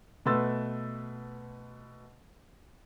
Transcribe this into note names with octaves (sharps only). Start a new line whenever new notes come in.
B2 A3 B4 C6 E6 A6